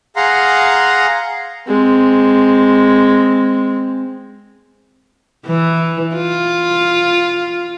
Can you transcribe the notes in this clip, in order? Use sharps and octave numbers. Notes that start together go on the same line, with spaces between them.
G#4 F5 F#5 A#5 C6
G#3 C4
E3
F4